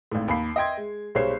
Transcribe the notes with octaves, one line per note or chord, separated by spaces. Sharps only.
G#1 A2
D#2 B5 C7
D#5 E5 G5 C6 G#6
G#3
B1 G3 G#3 C5 C#5 C7